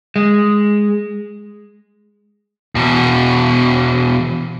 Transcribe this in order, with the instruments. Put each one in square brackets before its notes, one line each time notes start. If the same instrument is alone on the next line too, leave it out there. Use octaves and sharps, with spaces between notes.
[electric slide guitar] G#3
[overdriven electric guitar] E2 B2